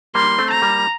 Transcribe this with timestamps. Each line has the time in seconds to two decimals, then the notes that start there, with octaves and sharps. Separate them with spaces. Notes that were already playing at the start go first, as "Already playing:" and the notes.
0.15 G3 A#3 C6
0.39 A3 C4
0.51 A#5
0.62 G3 A#3